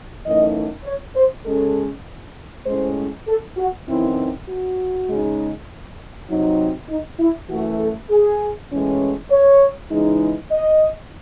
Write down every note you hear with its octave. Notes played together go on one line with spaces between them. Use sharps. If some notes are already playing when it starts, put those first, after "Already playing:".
F#2 E3 A3 D#4 D#5
C#5
C5
C#3 G#3 C#4 A4
A2 G#3 C#4 C5
A4
F#4
F#2 E3 C4 D#4 E4
F#4
C#3 G#3 D#4
C3 F#3 C4 D#4
D#4
E4
F#2 E3 A3 F#4
A4
G#4
A2 E3 G#3 C#4
C#5
C#3 E3 G#3 D#4
D#5